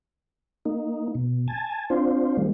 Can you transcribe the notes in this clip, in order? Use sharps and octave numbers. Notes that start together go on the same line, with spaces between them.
A#3 D#4
B2
G#5 A5
C4 D4 F4 C5
D#3 G3 G#3 A#3